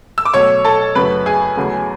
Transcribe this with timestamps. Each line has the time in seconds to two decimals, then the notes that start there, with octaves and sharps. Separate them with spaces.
0.18 E6
0.25 D6
0.33 B2 F#3 A3 C#5 C#6
0.64 A4 A5
0.95 F#2 C#3 F#3 A3 B4 B5
1.26 G#4 G#5
1.57 E2 C#3 F#3 A3